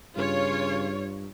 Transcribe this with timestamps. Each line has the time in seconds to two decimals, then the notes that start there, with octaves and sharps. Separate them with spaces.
0.17 G2 C#3 F4 C#5